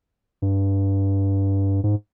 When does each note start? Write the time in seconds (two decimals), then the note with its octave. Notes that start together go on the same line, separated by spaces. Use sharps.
0.42 G2
1.84 G#2